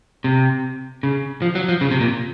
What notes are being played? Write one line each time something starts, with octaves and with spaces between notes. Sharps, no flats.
C3
C#3
F3
F#3
F3
C#3
C3
A#2